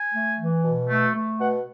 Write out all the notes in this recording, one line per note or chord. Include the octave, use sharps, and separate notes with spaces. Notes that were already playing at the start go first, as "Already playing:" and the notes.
Already playing: G#5
A3
E3
B2
A3
A3
B2 F#5